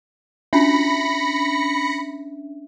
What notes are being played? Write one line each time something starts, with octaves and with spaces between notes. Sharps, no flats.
C#4 D4 E5 B5 A#6 C#7